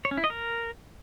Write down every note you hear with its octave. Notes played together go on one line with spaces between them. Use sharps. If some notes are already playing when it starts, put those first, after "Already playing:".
C#5
C#4
E4
D#5
A#4